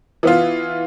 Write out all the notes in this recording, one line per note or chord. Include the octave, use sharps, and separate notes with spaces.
E3 B3 F4